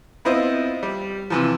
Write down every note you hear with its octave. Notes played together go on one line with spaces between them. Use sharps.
B3 C4 E4 F4 C5 D#5
G3
C3 E3 F3